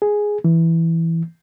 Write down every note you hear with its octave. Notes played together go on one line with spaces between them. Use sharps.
G#4
E3